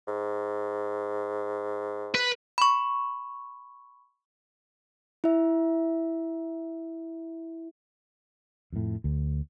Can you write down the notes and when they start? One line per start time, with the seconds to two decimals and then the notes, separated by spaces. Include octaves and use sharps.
0.08 G#2
2.14 B4
2.58 B5 C#6
5.24 E4 E5
8.73 F2 A2
9.04 D2